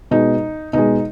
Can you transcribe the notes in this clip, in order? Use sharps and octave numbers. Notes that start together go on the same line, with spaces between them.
B2 G#3 D#4
B2 G#3 D#4